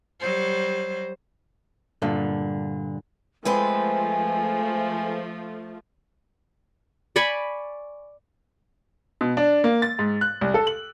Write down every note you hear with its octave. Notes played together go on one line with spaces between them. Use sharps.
F#3 G3 C5
G2 A#2 D3
F3 G#3 A3 C4 B4 G#5
D5 G#5 B5 C#6
B2
D4
A#3
A6
G#2
F#6
C2
A4
F#7